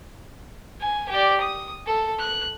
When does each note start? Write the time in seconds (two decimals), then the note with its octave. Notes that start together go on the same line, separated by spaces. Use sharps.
0.81 G#5
1.09 G4 D5
1.40 D#6
1.86 A4
2.19 F#6